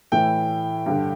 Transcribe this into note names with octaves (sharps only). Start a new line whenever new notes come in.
A2 E3 G5
G2 D3